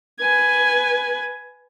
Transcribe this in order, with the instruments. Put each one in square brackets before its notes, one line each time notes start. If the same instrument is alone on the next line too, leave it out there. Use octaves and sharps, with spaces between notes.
[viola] B4 G#5